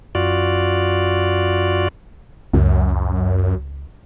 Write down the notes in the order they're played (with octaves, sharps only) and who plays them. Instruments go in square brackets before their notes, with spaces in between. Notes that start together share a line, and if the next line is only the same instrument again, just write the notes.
[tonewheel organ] F#2 F4 F#4 D5
[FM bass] C#2 [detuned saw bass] F#2